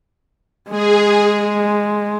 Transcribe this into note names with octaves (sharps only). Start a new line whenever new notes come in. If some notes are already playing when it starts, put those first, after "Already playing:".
G#3 G#4